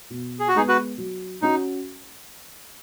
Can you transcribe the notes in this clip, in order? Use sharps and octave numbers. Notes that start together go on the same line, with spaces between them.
B2
G#4
F#4
G#3 B3 D#4 G#4
F#4 B4
F#3
C#4 D#4 F#4